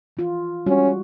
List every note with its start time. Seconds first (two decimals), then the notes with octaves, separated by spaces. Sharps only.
0.17 E3 F4
0.66 G3 G#3 C#4 F#4